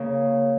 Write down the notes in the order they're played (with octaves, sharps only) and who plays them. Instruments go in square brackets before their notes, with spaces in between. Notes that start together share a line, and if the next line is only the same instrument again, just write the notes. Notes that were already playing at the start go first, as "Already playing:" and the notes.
Already playing: [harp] C#3 A#3